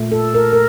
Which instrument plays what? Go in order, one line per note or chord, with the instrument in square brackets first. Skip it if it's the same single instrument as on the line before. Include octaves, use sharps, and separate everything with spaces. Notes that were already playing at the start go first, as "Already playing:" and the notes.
Already playing: [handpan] A#2 A3
A4
A#4
A#4